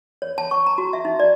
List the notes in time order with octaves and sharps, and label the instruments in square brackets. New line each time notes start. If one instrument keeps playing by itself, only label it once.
[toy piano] C#5
A5
C#6
A#5
F#4
E5
D#4
D5